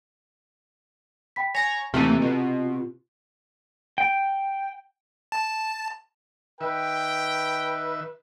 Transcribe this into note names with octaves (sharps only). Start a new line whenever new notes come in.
G5 B5 B6
C#5 G#5 A#5 A#6
D#2 C3 E3 A3 F6 D#7
B2 F4
G5
A5
D#3 B4 E5 G5